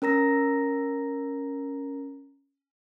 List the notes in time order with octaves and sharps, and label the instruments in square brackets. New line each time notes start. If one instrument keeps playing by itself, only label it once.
[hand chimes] C#4 A#4 A#5 A#6